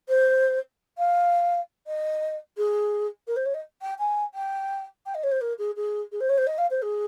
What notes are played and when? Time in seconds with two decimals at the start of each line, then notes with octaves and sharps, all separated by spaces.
0.08 C5
0.97 F5
1.86 D#5
2.57 G#4
3.27 A#4
3.36 C5
3.45 C#5
3.54 D#5
3.81 G5
3.98 G#5
4.34 G5
5.05 G5
5.14 D#5
5.23 C#5
5.31 C5
5.41 A#4
5.58 G#4
5.76 G#4
6.11 G#4
6.20 C5
6.29 C#5
6.37 C5
6.46 D#5
6.57 F5
6.70 C5
6.82 G#4